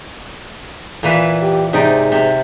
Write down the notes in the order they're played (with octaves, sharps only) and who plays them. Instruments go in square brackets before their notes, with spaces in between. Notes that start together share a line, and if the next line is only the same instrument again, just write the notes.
[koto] A#2 E3 B4
[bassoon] G4
[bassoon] G#2 [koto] C3 D#4 D5
[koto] C3